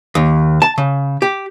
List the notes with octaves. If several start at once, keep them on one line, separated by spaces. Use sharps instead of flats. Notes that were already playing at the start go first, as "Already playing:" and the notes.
D#2
A5
C#3
G4